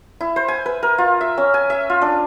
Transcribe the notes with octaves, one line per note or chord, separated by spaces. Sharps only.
E4
C5
G#5
B4
A#4
F4
E5
C#4
G#5
E5
F4
D4